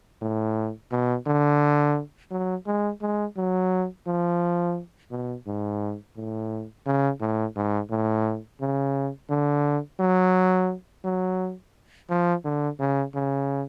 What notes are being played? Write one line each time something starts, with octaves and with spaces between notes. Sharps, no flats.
A2
B2
D3
F#3
G#3
G#3
F#3
F3
B2
G#2
A2
C#3
A2
G#2
A2
C#3
D3
F#3
F#3
F3
D3
C#3
C#3